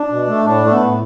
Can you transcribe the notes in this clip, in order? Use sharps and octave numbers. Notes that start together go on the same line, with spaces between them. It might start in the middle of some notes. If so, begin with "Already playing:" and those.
Already playing: D4
B2
A3
A2 D4
A3
B3
A2